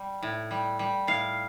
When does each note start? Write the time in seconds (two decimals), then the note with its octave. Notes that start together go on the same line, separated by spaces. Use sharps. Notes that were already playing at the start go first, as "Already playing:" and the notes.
Already playing: G3
0.23 A2
0.51 G3
0.79 G3
1.07 A2 F5